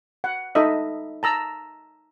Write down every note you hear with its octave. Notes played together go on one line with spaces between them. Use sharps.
F#5
D#4 A4 D#5 E5
A5 A#5 E6